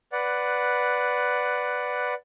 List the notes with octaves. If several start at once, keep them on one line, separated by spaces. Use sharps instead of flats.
B4 D5 F#5